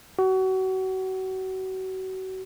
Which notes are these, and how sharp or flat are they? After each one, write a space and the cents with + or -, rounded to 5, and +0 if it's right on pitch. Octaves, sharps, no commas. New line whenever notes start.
F#4 +30